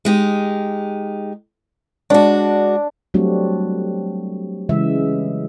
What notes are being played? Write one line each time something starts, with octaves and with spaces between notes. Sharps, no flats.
G#3 D#4 G4
G#3 D4 F#4
F#3 G3 A3 C4 D4 F#4
C#3 E3 G#3 E5